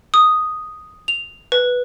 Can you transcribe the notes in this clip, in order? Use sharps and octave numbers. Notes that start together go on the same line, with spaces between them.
D#6
F7
B4